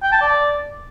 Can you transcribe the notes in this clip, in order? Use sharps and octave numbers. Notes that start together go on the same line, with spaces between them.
G5
A5
D5